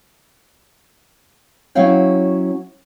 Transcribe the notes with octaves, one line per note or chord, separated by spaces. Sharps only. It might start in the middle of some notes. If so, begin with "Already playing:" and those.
F#3 C#4 E4 C#5 F5 G5